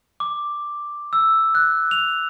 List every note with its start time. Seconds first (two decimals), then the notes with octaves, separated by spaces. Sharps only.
0.20 D6
1.13 E6
1.55 F#6
1.91 F7